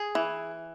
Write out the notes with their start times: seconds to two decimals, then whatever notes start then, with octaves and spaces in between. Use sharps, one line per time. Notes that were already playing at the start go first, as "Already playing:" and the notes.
Already playing: G#4
0.15 E3